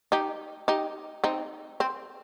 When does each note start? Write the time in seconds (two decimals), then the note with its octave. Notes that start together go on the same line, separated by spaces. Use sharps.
0.12 D#4 G4
0.68 D#4 G4
1.24 C4 D#4
1.80 C4